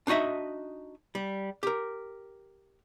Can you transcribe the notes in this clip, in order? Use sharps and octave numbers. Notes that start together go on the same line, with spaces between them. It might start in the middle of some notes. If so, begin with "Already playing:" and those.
D4 D#4 F#4 D#5 E5
G3
G4 A#4